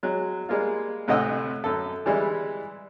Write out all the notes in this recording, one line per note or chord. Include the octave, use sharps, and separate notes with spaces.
F#3 G#3
G3 G#3 A#3 F4
D2 A2 C3 D#5 F#5 E6
F#2 A4
E3 G3 G#3 E4